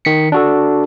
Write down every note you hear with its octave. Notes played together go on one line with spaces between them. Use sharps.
D#3 B6 C#7
D4 F#4 A4